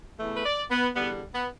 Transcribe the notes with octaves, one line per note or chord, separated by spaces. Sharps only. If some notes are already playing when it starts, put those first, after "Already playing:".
E2 E3 A3
B4
D5
B3
E2 D3 G3 B3
B3